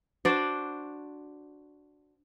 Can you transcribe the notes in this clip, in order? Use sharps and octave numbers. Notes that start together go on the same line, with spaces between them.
D4 F#4 C5 D5